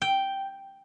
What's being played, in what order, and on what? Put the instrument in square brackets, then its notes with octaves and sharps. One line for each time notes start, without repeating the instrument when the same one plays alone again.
[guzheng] G5